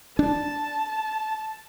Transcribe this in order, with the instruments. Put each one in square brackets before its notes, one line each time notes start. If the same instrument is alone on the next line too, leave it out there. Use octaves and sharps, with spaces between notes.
[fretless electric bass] D4 [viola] A5